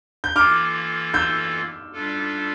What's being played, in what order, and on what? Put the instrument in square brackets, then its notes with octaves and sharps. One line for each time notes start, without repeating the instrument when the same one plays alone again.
[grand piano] G6
[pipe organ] E3 A#3 F4 A4 [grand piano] D6 F6
[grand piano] E6 G6
[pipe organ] G3 D4 F4 A4